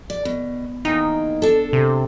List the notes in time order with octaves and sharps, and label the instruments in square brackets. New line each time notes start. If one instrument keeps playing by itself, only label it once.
[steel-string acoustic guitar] D5
B2
[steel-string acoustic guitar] E2 A#3 G5 [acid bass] D#4
[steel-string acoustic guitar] D4 A4
[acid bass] C3